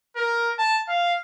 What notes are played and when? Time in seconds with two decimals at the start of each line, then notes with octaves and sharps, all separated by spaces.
0.16 A#4
0.59 A5
0.88 F5